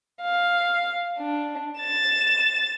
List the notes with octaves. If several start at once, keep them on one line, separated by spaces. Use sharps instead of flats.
F5
D4
A6 E7